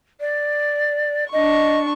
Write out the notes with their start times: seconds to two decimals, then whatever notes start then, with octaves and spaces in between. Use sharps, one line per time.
0.20 D5
1.32 D4 D#5 C#6